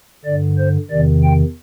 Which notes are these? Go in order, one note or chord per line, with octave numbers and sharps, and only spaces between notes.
G2 D3 D5
C5
E2 C3 D#3 D5
G5